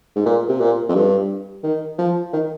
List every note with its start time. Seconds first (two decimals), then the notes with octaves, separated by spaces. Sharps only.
0.16 G#2
0.26 A#2
0.49 C3
0.60 A#2
0.89 F2
0.95 G2
1.64 D#3
1.99 F3
2.33 D#3